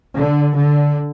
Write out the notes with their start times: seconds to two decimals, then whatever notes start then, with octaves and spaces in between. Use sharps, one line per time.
0.15 D3
0.54 D3